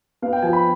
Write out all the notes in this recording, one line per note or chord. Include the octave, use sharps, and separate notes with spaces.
B3 F5
G5
F3 G#5
B5